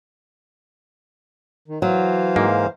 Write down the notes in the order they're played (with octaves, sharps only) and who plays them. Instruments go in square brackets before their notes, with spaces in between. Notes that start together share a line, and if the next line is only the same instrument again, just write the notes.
[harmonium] D#3
[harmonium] E3 C5 F5 [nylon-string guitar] F#3
[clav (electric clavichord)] G#2 A#3